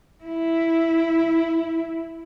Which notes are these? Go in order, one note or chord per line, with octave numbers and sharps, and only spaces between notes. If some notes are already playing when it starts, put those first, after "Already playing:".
E4